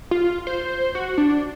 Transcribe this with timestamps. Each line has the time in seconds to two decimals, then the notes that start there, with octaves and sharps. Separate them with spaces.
0.11 F4
0.47 C5
0.95 F#4
1.18 D4